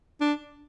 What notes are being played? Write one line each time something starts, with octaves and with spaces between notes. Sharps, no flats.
D4